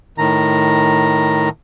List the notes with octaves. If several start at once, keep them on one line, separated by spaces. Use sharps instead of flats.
A2 D#3 A#5